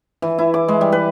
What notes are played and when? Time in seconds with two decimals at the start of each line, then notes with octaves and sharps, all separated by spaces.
0.22 E3
0.38 E4
0.54 D6
0.68 G#3
0.81 G3
0.92 B4